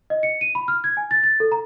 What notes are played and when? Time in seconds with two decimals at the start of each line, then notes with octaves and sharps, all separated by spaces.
0.10 D#5
0.23 C#7
0.41 D#7
0.55 B5
0.68 F6
0.84 G#6
0.97 G#5
1.11 A6
1.23 A6
1.40 A4
1.52 A#5